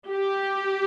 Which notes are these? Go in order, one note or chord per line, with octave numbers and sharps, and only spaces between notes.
G4